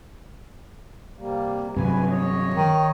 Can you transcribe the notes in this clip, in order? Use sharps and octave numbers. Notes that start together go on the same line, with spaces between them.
C3 G3 A#3
G2 C3 F#3 B4 G#5
C#5 D#5
D#3